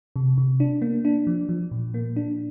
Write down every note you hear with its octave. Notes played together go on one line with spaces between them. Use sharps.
C3
C3
D4
A#3
D4
F3
F3
A#2
A#3
D4